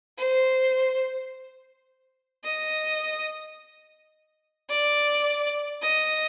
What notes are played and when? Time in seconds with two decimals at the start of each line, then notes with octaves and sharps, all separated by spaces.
0.18 C5
2.44 D#5
4.69 D5
5.82 D#5